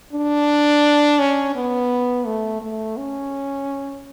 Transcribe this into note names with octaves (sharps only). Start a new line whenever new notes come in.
D4
C#4
B3
A3
A3
C#4